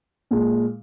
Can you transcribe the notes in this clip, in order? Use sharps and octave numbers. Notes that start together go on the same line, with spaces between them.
A#2 G#3